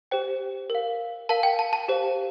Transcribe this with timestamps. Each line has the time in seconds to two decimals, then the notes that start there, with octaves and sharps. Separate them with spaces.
0.11 G4 C5 G5
0.70 A#4 F5
1.29 A#4 F5 A5
1.43 G5
1.59 A5
1.73 A5
1.88 G4 C5 F5